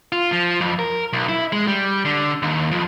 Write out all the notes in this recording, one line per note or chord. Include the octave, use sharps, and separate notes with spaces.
F4
F3
F2
A#4
B1
E4
G#3
G3
D3
D#2
F2